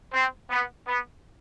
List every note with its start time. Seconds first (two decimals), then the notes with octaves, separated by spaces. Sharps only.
0.13 C4
0.49 B3
0.86 B3